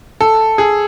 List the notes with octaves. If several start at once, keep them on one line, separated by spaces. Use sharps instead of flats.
A4
G#4